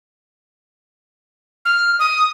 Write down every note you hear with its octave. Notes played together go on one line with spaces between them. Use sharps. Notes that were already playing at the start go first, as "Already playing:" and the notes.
F6
D#6